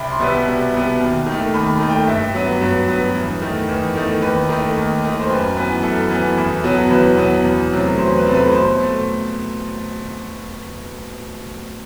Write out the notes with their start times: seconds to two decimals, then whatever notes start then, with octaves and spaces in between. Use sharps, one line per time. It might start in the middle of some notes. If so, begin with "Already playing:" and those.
Already playing: C2 B5
0.10 C6
0.19 B2 G3 B3
0.28 E6
0.46 C2
0.73 B2 G3 B3
1.00 D#2
1.26 D#3
1.32 A3
1.54 D#2 B5
1.80 D#3 A3
1.89 G5
2.07 G2 E5
2.34 F#3 B3
2.61 G2
2.88 F#3 B3
3.14 E2
3.42 D#3 A3
3.68 E2
3.96 D#3 A3
4.22 D#2 B4
4.49 D#3 A3
4.76 D#2
5.03 D#3 A3
5.20 C5
5.30 F#2 B4
5.57 E3 B3
5.83 F#2 A4
6.10 E3 B3
6.37 E2
6.64 B2 F#3 B3
6.90 E2 B4
7.17 B2 F#3 B3
7.45 E2
7.71 C3 F#3 A3
7.98 E2 C5
8.16 B4
8.25 C3 F#3 A3
8.34 B4
8.52 B2 C5
8.79 A3